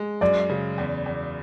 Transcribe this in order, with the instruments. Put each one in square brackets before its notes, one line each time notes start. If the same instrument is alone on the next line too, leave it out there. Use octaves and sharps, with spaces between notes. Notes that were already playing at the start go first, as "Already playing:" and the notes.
Already playing: [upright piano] G#3
[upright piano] F#2 [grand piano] D5
[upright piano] C#3
E2
E2